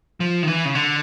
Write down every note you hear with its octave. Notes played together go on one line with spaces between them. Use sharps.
F3
D#3
E3
C#3
D3